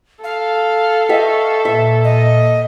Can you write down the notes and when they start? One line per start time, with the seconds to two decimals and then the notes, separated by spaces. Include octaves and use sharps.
0.24 A4 F5
1.09 D#5 E5 G5 C#6
1.65 A#2 E5
2.04 D#5